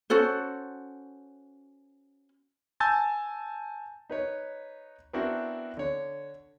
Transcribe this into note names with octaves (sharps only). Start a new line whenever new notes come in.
C#4 F#4 A4 C5
G#5 A5 E6 G6 A6
D#4 B4 C#5
B3 C4 D4 E4 F#4 A#4
D3 C#5